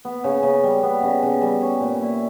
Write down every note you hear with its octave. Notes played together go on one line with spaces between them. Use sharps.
B3
C#3
C#3
G3
B3
C#3
C#3
G3
C#4
A#2
E4